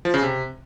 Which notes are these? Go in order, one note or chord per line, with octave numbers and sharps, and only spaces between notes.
F3
C#3
C3